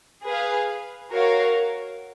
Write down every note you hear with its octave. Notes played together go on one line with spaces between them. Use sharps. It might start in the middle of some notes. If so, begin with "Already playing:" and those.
G#4 B4 F5
F#4 A#4 C#5 F5